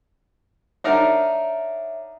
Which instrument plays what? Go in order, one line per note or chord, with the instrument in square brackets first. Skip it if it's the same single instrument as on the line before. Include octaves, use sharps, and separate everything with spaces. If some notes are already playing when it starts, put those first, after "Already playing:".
[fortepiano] D4 D#4 A#4 [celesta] C#5 E5 F#5